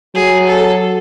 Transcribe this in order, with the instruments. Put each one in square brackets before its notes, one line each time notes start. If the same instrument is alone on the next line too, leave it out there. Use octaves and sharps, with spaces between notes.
[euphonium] F#3 [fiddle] G#4
[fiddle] A4